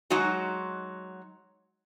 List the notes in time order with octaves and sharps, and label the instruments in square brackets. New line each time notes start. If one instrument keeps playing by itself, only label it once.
[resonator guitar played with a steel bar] F#3 G#3 D#4 F#4